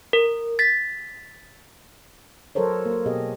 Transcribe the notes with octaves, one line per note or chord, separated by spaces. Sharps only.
A#4
A6 B6
F#3 A4 A#4 C5 C#5
A#3
B2 G4 G#4 D#5